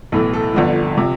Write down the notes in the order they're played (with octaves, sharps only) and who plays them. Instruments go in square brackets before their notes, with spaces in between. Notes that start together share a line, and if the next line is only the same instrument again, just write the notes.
[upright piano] B1 A2 E3 A4
A4
G1 F2 D3 F3
C3 F3